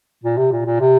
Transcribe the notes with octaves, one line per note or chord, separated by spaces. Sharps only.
A#2
C3
A#2
A#2
C3